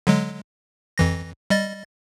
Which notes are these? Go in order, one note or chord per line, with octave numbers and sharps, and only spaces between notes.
D3 F#3 G#3
F2 E3 A#6
G3 D#5 A6